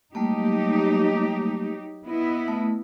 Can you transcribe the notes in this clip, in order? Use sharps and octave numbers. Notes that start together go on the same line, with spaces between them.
F#3 G3 A3 A#3 D#4 G4
B3 E4 D#5
A3